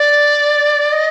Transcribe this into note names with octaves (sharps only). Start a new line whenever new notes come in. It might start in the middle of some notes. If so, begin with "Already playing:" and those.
Already playing: D5
D#5